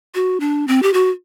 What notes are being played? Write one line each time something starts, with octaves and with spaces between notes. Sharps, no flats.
F#4
D4
C4
G4
F#4